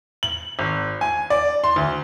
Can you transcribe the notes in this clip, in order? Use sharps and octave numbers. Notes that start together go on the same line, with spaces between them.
F#7
G#1
G#5
D5
C6
D2